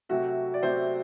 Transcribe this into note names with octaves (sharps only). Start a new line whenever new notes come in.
C3 F#3 A3 F#4
D5
C3 F#3 A3 C5